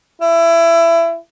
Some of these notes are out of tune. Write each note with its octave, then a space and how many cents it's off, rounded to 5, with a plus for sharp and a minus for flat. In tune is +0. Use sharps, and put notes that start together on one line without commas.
E4 +20